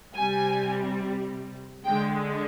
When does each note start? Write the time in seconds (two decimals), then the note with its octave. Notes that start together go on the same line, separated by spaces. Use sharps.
0.14 C3 G3 G#5
1.85 D3 G#3 G5